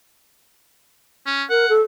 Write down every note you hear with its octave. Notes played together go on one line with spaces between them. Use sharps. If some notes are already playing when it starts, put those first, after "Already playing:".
C#4
A#4 F#5
A4